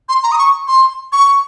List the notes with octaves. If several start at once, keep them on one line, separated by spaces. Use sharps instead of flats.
C6
A#5
D#6
C#6
C6
C#6